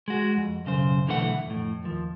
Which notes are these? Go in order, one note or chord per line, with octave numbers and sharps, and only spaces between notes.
G#3 F#4
F2
B1 F#2 C#3 C5
B1 D3 E3 A3 G4 F#5
F2 A2
D#2 F3